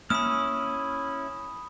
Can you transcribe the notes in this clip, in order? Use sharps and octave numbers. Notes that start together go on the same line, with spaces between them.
A#3 C#4 E4 B5 D#6 F6